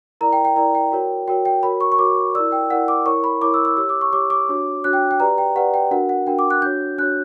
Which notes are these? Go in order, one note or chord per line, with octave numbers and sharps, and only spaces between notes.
E4 A#4 D5 A#5
G5
G5
E4 A#4 D5 A#5
G5
F#4 A#4 C#5
F#4 A#4 C#5 G5
G5
F#4 A#4 C#5 B5
C#6
C#6
F#4 A#4 C#5 D6
E4 A#4 D5 E6
G5
E4 A#4 D5 F#5
D6
E4 A#4 C#5 C#6
B5
E4 A#4 C#5 D6
E6
E6
G4 C#5 E6
D6
C#6
G4 C#5 D6
D6
D4 F#4 C#5
D4 F#4 C#5 F#6
G5
G5
G4 B4 D5 A#5
G5
G4 B4 D5 F#5
G5
D4 F#4 A#4 F#5
F#5
D4 F#4 A#4 G5
D6
F#6
D4 F#4 C#5 G6
D4 F#4 C#5 F#6